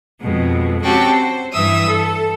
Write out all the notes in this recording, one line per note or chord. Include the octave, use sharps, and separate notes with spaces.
F2 B2 G#3
C4 C#4 F#4 G4 G5 A5
C5
G2 E3 E5 D#6 E6
A4